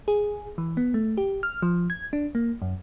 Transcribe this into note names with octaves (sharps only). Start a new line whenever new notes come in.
G#4
E3
B3
A3
G4
F6
F3
G#6
D4
A#3
F#2